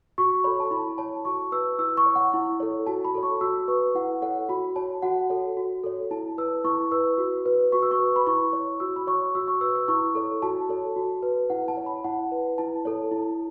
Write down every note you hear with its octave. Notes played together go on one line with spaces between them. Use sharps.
F#4 C#6
A4 C#5 B5
A5
E4 B5
C#5 A5
F#4 C#6
B4 E6
E4 E6
C#6
C#5
F#5
E4
A4 C#5
F#4 A5
B5
A4 C#5
C#6
F#4 E6
B4 C#6
E4 F#5
A4 C#5 F#5
F#4 B5
C#5 A5
F#4 F#5
A4 C#5
F#4
A4 C#5
E4 A5
B4 E6
E4 C#6
B4 E6
F#4
B4
F#4 C#6
E6
C#6
B4
B5
E4 C#6
C#5
F#4 E6
B5
C#5 C#6
F#4 E6
C#6
B4 E6
E6
E4 C#6
A4 C#5
F#4 A5
A4 C#5
F#4
B4
E4 F#5
A5
C#5
B5
E4 F#5
B4
E4 A5
A4 C#5
E4